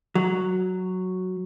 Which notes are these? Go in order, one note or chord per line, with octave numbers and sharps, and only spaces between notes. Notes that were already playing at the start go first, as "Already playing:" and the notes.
F#3